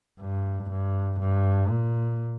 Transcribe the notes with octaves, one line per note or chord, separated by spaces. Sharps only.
G2
G2
G2
A#2